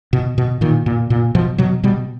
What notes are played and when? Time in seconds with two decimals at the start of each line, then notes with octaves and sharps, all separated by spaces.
0.13 B2
0.38 B2
0.61 A#2 D#3
0.86 A#2
1.10 A#2
1.35 B2 F3
1.58 B2 F#3
1.83 B2 G3